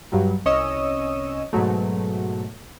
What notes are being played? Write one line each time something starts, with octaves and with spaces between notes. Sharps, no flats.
G2 F#3 G3
C2 C#4 C#5 D#5 D#6 E6
G#2 B2 F#3 A3